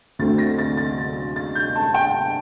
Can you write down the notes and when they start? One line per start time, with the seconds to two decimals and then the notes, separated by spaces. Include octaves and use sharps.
0.19 D2 D3 A3 C4 A6
0.38 A#6
0.58 A6
0.77 A6
1.36 A6
1.55 G6
1.76 A5
1.94 G5